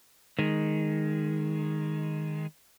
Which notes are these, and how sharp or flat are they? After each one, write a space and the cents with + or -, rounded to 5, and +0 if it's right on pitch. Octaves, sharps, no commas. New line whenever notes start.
D#3 +0 G#3 +0